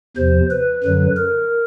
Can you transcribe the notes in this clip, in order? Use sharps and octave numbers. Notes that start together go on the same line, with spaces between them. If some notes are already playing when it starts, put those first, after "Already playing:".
E2 C3 F3 C5
B4
F#2 D3 F#3
A#4